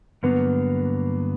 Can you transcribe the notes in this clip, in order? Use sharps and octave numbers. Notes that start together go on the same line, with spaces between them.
G2 D3 F#3 A#3 B3